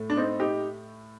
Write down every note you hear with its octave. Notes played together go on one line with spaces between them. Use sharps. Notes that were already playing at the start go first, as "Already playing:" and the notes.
Already playing: A2 A3
D4
C4 D#4
D#4 G4